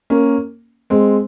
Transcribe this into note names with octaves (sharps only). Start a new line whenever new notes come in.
A#3 C#4
G#3 C4